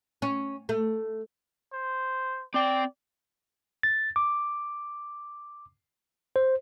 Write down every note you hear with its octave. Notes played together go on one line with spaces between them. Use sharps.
C#4
A3
C5
C4 D5 G5
A6
D6
C5